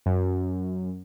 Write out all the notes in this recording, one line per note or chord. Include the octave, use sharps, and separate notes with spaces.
F#2